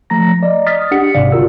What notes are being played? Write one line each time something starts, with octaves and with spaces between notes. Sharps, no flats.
F3 A3 A#5 A#6
D5 D#5
D#6 F6 A6 B6
D4 G4 F#5 C#7
G#1 G#2 C3 D5 F5
G1 F4 F#4 A#4 E6